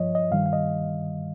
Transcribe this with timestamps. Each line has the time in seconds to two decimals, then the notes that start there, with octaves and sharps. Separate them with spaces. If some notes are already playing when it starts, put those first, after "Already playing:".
Already playing: G2 F3 C#5 D#5
0.15 D#5
0.31 G2 D#3 G3 F5
0.46 F5
0.53 D#5